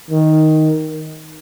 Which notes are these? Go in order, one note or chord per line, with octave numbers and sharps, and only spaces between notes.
D#3